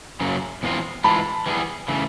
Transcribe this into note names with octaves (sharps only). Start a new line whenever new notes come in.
F#2 C#3 F#3 A#3
E2 B2 G#3 C4 F4
G#2 E3 G#3 F4 A5 B5
E3 G3 B3 D#4 G#4
C#3 E3 A3